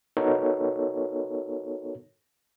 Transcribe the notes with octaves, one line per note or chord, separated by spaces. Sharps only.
B3 D#4 F#4 A4 A#4 C#5